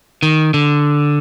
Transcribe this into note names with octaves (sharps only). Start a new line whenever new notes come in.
D#3
D3